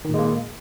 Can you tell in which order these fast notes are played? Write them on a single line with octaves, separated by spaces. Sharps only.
D#3 A#2 G#3 A#3